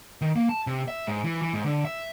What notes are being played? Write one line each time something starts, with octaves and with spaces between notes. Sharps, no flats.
D#3
A#3
A5
C3
E5
G#2
E3
E3
G#2
D3
E5